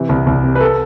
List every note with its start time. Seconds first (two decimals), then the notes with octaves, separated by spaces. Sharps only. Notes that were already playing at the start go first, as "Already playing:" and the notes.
Already playing: C3 E3
0.09 C2
0.27 C2
0.44 C3
0.55 B4
0.61 A4